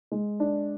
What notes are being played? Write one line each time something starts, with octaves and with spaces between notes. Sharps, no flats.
G#3
D4